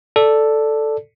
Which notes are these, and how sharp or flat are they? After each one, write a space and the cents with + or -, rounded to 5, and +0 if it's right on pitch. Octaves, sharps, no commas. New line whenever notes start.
A4 +0 D5 +0